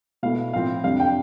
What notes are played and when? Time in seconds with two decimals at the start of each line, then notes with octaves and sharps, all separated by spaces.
0.23 B2 A3 E4 F5
0.53 A2 F3 C4 E4 F5
0.84 F2 C3 G3 D4 F5
1.00 G5